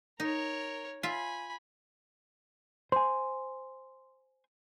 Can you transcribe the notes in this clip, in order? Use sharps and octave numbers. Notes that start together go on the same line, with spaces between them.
D#4 A#4 C#5
F4 E5 G#5 B5
C5 G#5 C6